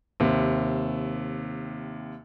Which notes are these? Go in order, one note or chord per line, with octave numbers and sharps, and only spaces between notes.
D#2 C3